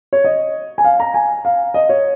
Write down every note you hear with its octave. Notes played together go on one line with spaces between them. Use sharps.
C#5
D#5
G#5
F5
A#5
G#5
F5
D#5
C#5